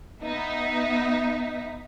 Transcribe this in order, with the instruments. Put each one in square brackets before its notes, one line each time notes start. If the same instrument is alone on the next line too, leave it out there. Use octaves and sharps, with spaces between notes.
[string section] B3 D#4 E5